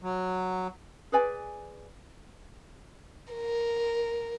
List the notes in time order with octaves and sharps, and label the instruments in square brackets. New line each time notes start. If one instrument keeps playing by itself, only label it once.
[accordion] F#3
[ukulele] G#4 B4 D5 G#5
[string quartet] A#4